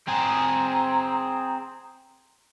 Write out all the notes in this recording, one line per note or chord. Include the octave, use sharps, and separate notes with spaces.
C4 G#4 A#5